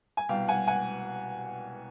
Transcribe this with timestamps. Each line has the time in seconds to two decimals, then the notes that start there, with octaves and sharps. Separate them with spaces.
0.17 G#5
0.29 C2 B2 F5 G5
0.48 F#5 G#5
0.67 F#5 G#5